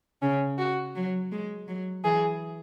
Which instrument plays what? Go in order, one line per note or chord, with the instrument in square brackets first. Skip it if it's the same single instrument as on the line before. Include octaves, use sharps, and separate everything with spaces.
[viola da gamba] C#3 [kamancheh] C#4
[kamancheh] F#4
[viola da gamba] F#3
G#3
F#3
[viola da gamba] E3 [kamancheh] G#4